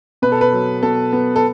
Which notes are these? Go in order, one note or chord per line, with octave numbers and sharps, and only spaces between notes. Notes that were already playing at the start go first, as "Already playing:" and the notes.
B2 B4
A4
B4
F#3
B2 A4
B3
A4